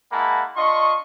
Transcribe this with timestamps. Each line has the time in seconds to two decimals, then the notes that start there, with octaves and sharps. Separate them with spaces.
0.11 G#3 A#3 E4 F#5 A5 B5
0.56 D4 F4 D#5 C6 C#6